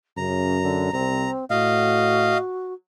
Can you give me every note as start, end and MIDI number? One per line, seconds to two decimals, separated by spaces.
0.17 0.90 42
0.17 0.61 49
0.17 0.93 82
0.62 0.90 50
0.93 1.27 36
0.93 1.45 60
0.93 1.31 82
1.50 2.36 45
1.50 2.73 66
1.50 2.38 75
1.50 2.38 77